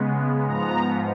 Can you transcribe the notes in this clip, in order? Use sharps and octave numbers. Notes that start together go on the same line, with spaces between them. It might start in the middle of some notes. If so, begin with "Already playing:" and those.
Already playing: C#3 G#3 B3
G#2 F3 B3 A#5